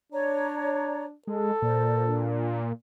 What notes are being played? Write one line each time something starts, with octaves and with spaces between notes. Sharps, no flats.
D4 C#5 D5 A#5
G#3 A4
A#2 A#4 C5 D5
D4